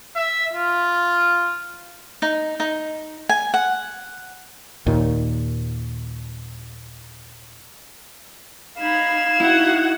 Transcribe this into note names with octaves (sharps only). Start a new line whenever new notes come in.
E5
F4
D#4
D#4
G#5
F#5
D#2 A#2 D#3
D#4 F5 B5 G#6 E7
D#4 E4 F#4 F#5